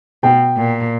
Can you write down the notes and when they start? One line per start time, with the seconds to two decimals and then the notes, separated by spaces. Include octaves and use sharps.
0.23 B2 G5
0.57 A#2